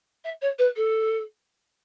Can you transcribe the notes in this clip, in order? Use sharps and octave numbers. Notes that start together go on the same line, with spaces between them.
E5
C#5
B4
A4